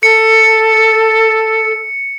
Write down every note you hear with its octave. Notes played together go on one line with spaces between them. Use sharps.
A4 C#7